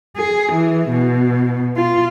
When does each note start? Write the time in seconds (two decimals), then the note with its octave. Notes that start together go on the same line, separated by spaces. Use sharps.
0.17 G#4
0.53 E3
0.89 B2
1.77 F4